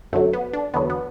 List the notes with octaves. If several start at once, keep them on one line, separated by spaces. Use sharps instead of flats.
F#2 D3 F#3 A3
B3
D4
E2 D3 F#3 B3
B3